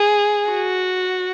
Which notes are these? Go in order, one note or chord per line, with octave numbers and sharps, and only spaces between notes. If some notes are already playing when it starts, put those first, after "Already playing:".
Already playing: G#4
F#4